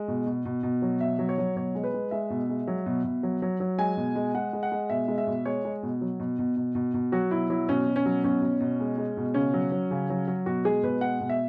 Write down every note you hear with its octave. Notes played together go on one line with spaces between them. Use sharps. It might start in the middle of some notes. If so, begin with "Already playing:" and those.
Already playing: G#3
B2
B2
B2
B2
F#3
B2 E5
F#3
C#5
F#3
B2 C#5
G#3
B4
G#3
G#3 E5
B2
G#3
F#3
B2
B2
F#3
F#3
F#3
G#3 G#5
B2
G#3
G#3 F#5
G#3
F#5
G#3
B2 E5
G#3
E5
B2
G#3 C#5
G#3
B2
F#3
B2
B2
B2
B2
B2
F#3 F#4
B2 E4
F#3 E4
B2 C#4
B2
C#4
F#3
B2 C#4
B2
B2
G#3
G#3
B2
C#3 C#4
F#3
F#3
C#3
F#3
F#3
B2 F#4
G#3 G#4
B2 B4
G#3 F#5
B2
E5